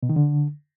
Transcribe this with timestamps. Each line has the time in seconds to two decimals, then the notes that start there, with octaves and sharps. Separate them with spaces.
0.03 B2
0.09 D#3
0.16 D3